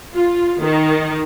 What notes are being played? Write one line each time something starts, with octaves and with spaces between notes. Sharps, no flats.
F4
D#3